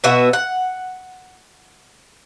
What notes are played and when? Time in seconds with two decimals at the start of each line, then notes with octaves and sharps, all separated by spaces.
0.04 B2 B3 F#4 E5
0.33 F#5